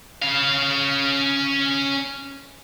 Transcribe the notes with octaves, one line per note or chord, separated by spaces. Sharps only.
C#4 F5